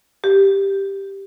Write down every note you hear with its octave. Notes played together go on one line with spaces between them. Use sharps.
G4